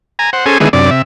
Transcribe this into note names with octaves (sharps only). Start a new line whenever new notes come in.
G#5 A#5
C5 F#5
C#4 G#4 A4 C5 G#5
D3 D#3 G#3 B3 E4 G#4
F#2 C3 D4 D5
C3 E5